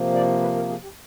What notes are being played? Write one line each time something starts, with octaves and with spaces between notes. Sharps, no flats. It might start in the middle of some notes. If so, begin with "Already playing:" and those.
Already playing: C3 F3 A#3
D5
B4
A#4
G#4
G4